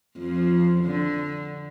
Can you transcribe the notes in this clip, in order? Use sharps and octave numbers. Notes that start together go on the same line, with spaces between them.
F2 F3
D3